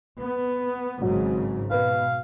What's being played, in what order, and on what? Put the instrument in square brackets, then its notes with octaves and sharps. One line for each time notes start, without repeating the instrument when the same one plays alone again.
[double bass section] B3
[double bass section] G#1 G#2 C#3 [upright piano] F#3
[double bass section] B2 [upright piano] B4 [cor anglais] F5